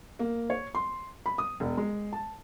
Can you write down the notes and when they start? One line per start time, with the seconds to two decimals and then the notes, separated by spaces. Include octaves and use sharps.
0.19 A#3
0.50 C#5
0.75 C6
1.26 B5
1.38 D#6
1.60 E1
1.77 G#3
2.13 A5